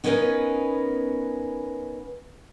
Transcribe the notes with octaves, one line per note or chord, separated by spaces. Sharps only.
B3 C#4 D#4 A#4 B4 G#5